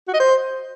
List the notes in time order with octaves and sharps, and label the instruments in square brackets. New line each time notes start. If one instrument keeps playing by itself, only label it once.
[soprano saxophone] F#4
D#5
C5